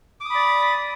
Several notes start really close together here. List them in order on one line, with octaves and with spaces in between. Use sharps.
D6 D#6 B5 D5